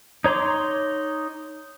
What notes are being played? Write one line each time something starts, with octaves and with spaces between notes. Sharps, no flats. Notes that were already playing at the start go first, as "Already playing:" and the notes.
D#4 C#5 A#5 C6 D6